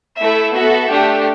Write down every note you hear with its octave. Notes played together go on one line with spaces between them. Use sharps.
A3 E4 A4 E5
B3 F#4 A4 E5
A3 D4 G4